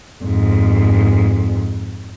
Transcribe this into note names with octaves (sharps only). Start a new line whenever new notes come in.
F2 G#2